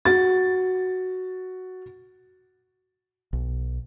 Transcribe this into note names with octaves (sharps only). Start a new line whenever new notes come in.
F#4 A6
B1